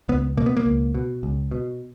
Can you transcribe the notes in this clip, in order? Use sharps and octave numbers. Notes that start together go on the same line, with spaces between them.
C#2 B3
B2 A#3
B3
A#3
C#2
B2
C#2
B2